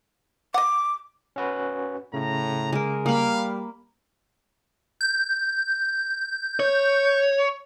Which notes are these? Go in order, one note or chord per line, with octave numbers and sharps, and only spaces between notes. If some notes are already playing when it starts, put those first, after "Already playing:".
D#5 F#5 D6
C#4 F#4 B4
A2 C#3 A#5
G#3 A#3 A#4
G3 A#3 F5 B5
G6
C#5